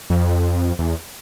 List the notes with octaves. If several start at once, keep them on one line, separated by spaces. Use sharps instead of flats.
F2
E2